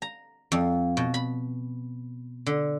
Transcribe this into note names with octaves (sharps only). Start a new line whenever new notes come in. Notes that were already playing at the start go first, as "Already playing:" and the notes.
A#5
F2
B2
B5
D3